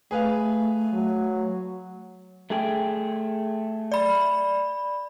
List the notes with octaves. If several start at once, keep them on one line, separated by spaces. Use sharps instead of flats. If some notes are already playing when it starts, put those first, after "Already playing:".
A3 G#4 B4 F5
F#3
A3 G#4 G5
D5 B5